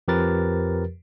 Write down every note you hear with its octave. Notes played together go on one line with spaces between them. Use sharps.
F2 F3 G4 A#4 B4 A6